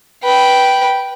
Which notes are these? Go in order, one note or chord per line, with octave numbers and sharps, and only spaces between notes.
B4 G5